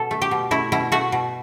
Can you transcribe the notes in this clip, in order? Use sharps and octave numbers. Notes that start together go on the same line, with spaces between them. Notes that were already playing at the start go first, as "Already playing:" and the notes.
Already playing: B2 A4
A3
G4
B2
A3 E4
B2 E4
A3 F#4
B2